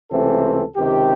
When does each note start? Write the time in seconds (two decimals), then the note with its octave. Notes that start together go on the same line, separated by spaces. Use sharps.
0.11 C#2 C3 E3 A3 C4 A4
0.76 C#2 C3 D#3 G4